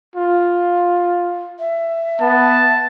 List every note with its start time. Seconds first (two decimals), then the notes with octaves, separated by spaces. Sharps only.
0.16 F4
1.60 E5
2.21 B3 A5